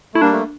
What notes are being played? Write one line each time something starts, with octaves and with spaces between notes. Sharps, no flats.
A3 E4
G3 A#3 D4
A3